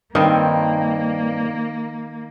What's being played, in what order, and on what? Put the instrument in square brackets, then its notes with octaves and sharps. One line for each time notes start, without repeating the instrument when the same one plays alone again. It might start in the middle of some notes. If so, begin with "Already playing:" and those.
[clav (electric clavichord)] G2 C4 [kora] D#3 [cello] A#3